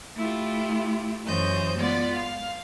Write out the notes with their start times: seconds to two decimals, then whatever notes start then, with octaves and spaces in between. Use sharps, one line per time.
0.15 A3 E4 F4 G4
1.27 F#2 E3 C5 C#5 D#5 G6
1.76 G#3 B3 F4 D5
2.15 F5